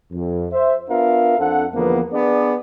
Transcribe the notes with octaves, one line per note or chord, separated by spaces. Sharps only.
F2
C5 E5
B3 D4 F4 A#4 E5 F5
F2 C4 D4 A4 F#5
E2 D3 F3 A#3 B3
B3 D4 G#4 D5